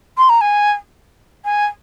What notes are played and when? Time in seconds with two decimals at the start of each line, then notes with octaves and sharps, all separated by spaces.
0.18 C6
0.29 A#5
0.41 G#5
1.45 G#5